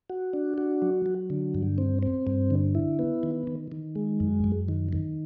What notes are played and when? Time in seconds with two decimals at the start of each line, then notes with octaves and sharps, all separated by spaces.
0.10 F#4
0.33 D4
0.58 F#4
0.82 F#3
1.06 F#3
1.30 D3
1.54 G2
1.78 C4
2.03 C4
2.27 G2
2.51 D3
2.75 E4
2.99 B3
3.23 D#3
3.47 D#3
3.72 D#3
3.95 G#3
4.20 F#2
4.44 F#2
4.68 D#3
4.93 D#3